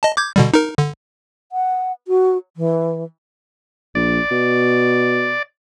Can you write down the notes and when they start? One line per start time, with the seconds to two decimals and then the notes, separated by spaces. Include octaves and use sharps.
0.03 D#5 A5
0.17 D6 G6 G#6
0.36 B2 D3 G3
0.54 D#4 A#4
0.78 D3
1.52 F#5
2.08 F#4
2.57 E3
3.95 A#1 D5
4.31 B2